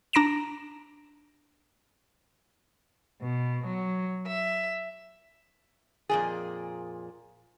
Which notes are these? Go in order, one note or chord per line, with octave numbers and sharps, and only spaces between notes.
D4 A#5 A#6 D7 E7
B2
F#3
E5
F2 A#2 G#4